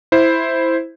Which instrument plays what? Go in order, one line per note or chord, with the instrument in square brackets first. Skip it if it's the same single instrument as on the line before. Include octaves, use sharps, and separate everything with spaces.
[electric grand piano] E4 C5